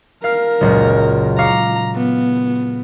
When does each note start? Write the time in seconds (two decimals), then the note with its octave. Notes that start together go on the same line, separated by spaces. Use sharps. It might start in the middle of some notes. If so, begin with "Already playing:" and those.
0.24 A#4 F5 F6
0.61 F#1 C#2 A#2
1.39 F5 A#5 C#6 D6
1.95 B3